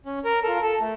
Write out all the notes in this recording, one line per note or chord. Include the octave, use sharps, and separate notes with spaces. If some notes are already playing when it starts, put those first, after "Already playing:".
C#4
A#4
F4 A4 A#4
A4
A3